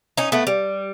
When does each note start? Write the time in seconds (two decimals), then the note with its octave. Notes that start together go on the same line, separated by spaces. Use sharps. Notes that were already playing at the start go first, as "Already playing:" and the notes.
0.17 C#4 D#4
0.32 A3 B3
0.47 G3